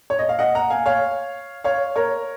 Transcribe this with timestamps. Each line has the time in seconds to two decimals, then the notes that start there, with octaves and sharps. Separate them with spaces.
0.10 C#5
0.19 D#5
0.29 F5
0.39 D#5 F#5
0.55 F#5 A#5
0.70 F5 G#5
0.86 C#5 F5
1.64 C#5 F5
1.96 A#4 C#5